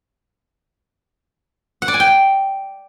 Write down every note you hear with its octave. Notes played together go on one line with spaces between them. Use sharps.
F#5
D5
G#5
G5